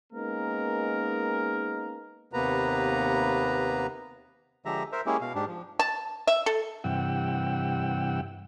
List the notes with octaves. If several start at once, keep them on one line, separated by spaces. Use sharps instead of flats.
G#3 A#3 B3 C#4 D#4 A#4
D#2 C3 A#3 B3 B4 A#5
D3 F3 G#3 G4 E5 A#5
A#4 C5 E5
G#3 A#3 C#4 E4 G4 G#4
B2 F5
G#2 D4 G4
F3
A5
E5
A4
G2 C3 E3 F#5 G5 E6